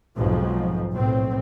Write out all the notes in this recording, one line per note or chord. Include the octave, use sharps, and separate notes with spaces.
B1 F2 G#2 F3
B1 A2 C4